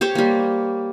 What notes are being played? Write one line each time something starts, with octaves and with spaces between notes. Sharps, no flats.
G4 C5 C#5
G3 A#3